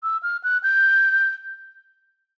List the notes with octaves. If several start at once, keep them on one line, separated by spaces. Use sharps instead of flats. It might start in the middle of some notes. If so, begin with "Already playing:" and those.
E6
F6
F#6
G6